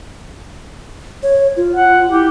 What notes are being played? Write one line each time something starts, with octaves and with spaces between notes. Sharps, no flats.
C#5
F4
F#5
E4 G4